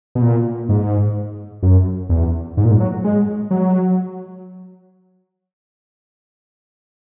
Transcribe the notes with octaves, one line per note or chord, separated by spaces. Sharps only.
B2
A#2
G#2
F#2
E2
G#2
A#2
G#2
F#3
G#3
F#3